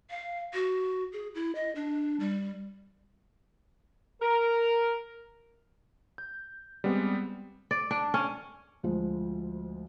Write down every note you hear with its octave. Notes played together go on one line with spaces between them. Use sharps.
F5
F#4
G#4
E4
D#5
D4
G3
A#4
G6
G3 G#3 B3 C4
D5
D4
C#4
D2 F3 G#3